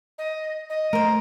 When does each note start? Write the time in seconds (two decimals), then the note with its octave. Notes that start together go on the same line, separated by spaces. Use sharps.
0.18 D#5
0.70 D#5
0.93 A3 A#4 C5